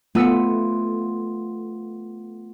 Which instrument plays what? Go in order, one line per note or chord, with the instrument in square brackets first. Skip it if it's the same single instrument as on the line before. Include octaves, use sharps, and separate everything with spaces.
[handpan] A3 F4 [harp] B3 E6 C#7